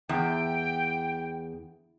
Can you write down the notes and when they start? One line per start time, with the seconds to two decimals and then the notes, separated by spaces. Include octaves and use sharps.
0.09 E2 G5